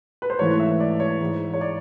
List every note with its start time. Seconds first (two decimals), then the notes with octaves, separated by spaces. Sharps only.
0.22 B4
0.30 C5
0.39 G#2 E3 A3 C#5
0.60 E5
0.80 D5
1.00 C#5
1.21 G#2 E3 G#3
1.54 C#5
1.61 D5